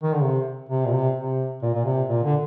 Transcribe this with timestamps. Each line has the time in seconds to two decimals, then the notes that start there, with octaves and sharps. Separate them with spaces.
0.03 D#3
0.13 D3
0.23 C3
0.69 C3
0.86 A#2
0.92 C3
1.15 C3
1.62 A#2
1.74 A#2
1.85 C3
2.09 A#2
2.24 D3